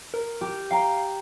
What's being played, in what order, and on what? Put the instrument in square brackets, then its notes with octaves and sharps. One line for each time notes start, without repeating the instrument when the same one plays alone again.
[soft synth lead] A#4
[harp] G4
[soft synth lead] F5 [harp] G5 A#5